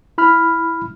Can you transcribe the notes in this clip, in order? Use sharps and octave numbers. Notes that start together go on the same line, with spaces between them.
E4 B5 F6